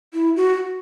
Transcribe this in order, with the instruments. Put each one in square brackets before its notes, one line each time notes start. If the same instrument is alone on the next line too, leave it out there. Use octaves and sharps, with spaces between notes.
[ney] E4
F#4